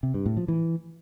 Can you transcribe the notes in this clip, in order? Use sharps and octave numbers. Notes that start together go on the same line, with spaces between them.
C3
G2
A2
F3
E3